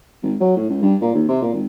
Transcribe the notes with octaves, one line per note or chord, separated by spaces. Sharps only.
G#1
F#3
A2
C#2
G2
A#2
D#2
C3
A#2
G#1